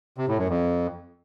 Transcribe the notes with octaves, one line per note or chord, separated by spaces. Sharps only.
C3
A2
F#2
F2